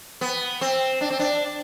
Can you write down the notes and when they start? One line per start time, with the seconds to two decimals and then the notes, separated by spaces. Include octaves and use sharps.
0.21 B3
0.61 C4
1.01 D4
1.10 C4
1.19 D4